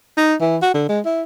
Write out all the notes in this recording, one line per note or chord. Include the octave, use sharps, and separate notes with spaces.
D#4
E3
F#4
D3
G#3
E4